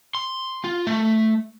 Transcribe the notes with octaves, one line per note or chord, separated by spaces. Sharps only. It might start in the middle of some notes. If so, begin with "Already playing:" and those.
C6
F4
A3